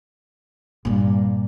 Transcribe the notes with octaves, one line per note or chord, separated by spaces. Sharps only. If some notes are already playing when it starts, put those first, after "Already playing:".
G2 A#2